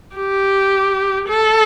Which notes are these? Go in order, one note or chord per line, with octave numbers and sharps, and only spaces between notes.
G4
A4